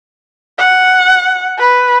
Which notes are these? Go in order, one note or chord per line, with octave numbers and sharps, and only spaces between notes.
F#5
B4